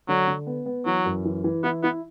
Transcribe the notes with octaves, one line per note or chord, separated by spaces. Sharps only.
D3 F#3
D3
B3
B3
E3 F#3
F#2
E3
E3
B3 E4
B3 E4